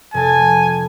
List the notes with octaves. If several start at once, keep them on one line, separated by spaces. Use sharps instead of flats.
F1 G#5 A5